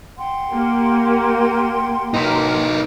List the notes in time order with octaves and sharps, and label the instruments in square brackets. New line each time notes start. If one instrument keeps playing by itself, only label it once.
[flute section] F#5 G5 C6
[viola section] A#3 G4
[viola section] F#3 A#3 A#4 [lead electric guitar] D#4 B4